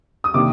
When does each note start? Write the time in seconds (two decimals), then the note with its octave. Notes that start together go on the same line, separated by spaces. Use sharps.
0.24 D#6
0.34 C3 D#3 A#3 D4 D6